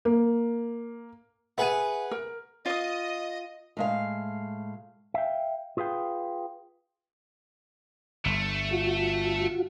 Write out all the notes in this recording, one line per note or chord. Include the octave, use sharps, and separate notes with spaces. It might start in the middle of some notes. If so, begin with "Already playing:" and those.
A#3
G#4 B4 E5 F#5 G#5
A#4
F4 D#5 D#6
A2 G#3 F5
E5 F5 G5
F4 G#4 B4 F5 G5
G1 A3
F4 F#4